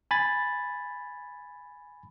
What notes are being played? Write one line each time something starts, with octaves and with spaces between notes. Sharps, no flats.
G#5 B5 A6